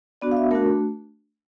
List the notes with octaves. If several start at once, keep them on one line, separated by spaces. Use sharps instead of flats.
B3 D4 F#4 D5
F5
E5
A3 D4 F#4 A#4